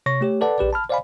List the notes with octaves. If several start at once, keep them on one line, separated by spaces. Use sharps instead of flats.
C3 C#5 C#6 A#6
A3 G4 C#5
A4 B4 D5 F#5 A5
A#1 G4 B4 D5
A5 B5 F6
C5 D5 D#5 F5 G#5 B5